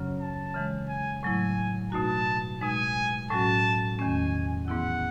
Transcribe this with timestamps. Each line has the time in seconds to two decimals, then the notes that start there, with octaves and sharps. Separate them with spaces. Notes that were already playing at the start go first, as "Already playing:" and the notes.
Already playing: F#2 C#3 F#3 C#4
0.20 A5
0.54 C#3 E3 G#3
0.89 G#5
1.23 A2 F#3 A3 E4 G#5
1.92 B2 A3 D#4 F#4 A5
2.61 B2 G#3 D#4 G#5
3.30 A2 F#3 C#4 F#4 A5
3.99 E2 D#3 A3 C#4 G#5
4.67 G#2 E3 B3 E4 F#5